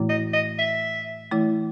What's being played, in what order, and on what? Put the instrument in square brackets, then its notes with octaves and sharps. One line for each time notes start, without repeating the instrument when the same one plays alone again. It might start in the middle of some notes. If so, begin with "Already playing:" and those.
Already playing: [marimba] A2 E3 A3 E4
[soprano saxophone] D#5
D#5
E5
[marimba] E3 A3 E4